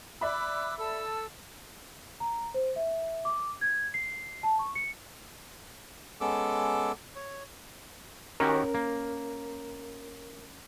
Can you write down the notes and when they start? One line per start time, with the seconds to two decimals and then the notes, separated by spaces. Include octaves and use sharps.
0.21 D5 E5 B5 D6 E6 F#6
0.78 A4 A5 E6
2.20 A#5
2.54 C5
2.76 E5
3.25 D6
3.61 G#6
3.94 C7
4.43 A5
4.59 C#6
4.75 C#7
6.21 G#3 B3 C#4 A4 D6 E6
7.16 C#5
8.40 D#3 C#4 F#4 G4 A#4
8.74 A#3